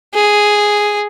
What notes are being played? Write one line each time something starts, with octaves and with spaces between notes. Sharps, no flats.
G#4